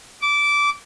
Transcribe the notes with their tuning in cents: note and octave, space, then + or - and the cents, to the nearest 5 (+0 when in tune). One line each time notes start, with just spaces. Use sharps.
D6 -15